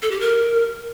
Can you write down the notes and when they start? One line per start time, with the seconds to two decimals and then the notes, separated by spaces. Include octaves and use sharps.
0.02 A4
0.11 G4
0.20 A#4